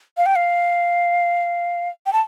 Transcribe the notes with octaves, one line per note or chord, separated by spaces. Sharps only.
F5
G5
F5
G5
A5